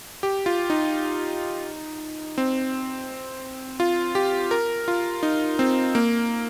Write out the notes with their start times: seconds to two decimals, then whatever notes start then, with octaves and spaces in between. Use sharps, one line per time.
0.23 G4
0.46 F4
0.70 D#4
2.38 C4
3.80 F4
4.15 G4
4.51 A#4
4.88 F4
5.23 D#4
5.59 C4
5.95 A#3